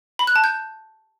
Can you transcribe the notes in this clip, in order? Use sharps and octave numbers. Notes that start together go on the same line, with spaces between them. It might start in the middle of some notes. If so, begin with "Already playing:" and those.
B5
F#6
A5
G6